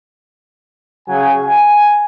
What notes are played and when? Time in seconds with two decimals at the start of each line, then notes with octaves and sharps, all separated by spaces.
1.08 C#3 F#3 G#5
1.44 G#5